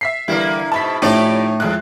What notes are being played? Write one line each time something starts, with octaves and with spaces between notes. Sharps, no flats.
E5 B6 C7
D3 E3 G3 A#3 E4
G#2 B2 A5 B5 B6
A2 F3 C#4 D#4 E4 G4 D5
F2 A2 G#3 F#6